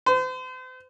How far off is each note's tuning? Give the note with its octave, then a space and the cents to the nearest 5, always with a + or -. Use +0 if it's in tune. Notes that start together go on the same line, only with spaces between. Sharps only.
C5 -40